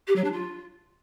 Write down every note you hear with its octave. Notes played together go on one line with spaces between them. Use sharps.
G4
F#3
D4
F4